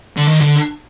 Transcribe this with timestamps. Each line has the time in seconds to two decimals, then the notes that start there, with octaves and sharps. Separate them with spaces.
0.17 D3
0.27 D#3
0.41 D3